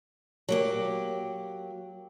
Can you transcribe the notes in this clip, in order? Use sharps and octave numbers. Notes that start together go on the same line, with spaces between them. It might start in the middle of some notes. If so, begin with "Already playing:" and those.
F#3 A#3 G4